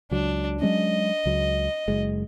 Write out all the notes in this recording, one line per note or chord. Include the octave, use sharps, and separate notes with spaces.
C#2 F#3 D4
F#3 G#3 C#4 D#5
C#2 F#3
F#1 G#3